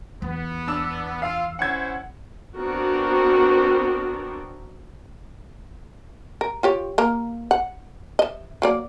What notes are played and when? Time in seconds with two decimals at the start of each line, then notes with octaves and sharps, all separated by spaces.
0.22 E2 B3
0.67 D4 E6 E7
1.22 F4 F5 E6
1.59 C#4 E4 C5 F#5 G#6
2.56 B3 C4 D4 F#4 A#4
6.41 A#4
6.63 F4 G4 C#5
6.98 A#3 A#4
7.51 F#5
8.19 D#5 E5
8.62 F#3 A#3 D5